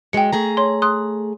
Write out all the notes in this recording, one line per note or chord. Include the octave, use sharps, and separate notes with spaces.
F#2 G#3 G5 C#7
A3 G#4 A#5
C#5 C6
C6 D#6 F#6